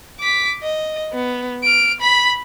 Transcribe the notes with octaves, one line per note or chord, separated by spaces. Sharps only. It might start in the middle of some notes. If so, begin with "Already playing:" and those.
D6 B6
D#5
B3
F6 D7
B5 B6